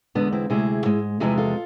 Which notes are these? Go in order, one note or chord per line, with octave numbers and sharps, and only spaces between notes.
E2 D3 G#3 B3 D4
C4 E4
D2 C3 G#3 E4 G#4
G#2 G#3
E2 C3 F3 G#3 E4 G#4
F4 A4